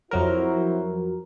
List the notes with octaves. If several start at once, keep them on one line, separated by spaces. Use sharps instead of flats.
F2 F#3 E4 F#4 A#4 C5